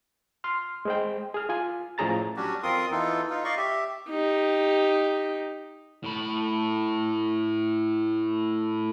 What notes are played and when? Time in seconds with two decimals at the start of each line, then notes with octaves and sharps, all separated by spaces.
0.44 C6 F6
0.85 G#3 C5 G5
1.34 G#4 F6
1.49 F4 G#5
1.98 A2 F3 C#4 G#4 A#5 A6
2.36 F#3 G3 C#4 D4 F#4 G4
2.63 F2 C4 F4 A#4 C6 D#6
2.91 E3 B3 D#4 F4 A4
3.30 D#4 F4
3.44 D5 D#5 F5 C#6
3.57 G4 E5
4.09 D#4 G4
6.04 A2 B5